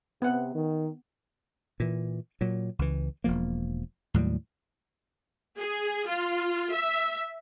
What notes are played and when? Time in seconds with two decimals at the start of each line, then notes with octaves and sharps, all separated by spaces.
0.22 C3 B3 F#5
0.54 D#3
1.80 A#2 E3
2.41 A#2 F#3
2.79 C#2 E3
3.24 E1 F3 A#3
4.14 D#2 A2 F#3 G3
5.58 G#4
6.08 F4
6.73 E5